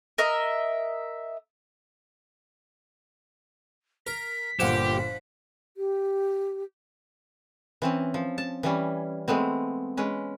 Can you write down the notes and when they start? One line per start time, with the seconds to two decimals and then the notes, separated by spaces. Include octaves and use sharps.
0.18 A#4 D#5 E5
4.07 A#4 B6
4.59 G1 A#2 F3 G4 F#5 E7
5.77 G4
7.82 E3 C4 C#4
8.14 F3
8.38 A5
8.63 E3 G3 C#4
9.28 G#3 A3 B3 C4
9.97 G#3 C#4 B4